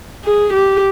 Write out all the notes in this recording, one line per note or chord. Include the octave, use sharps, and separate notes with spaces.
G#4
G4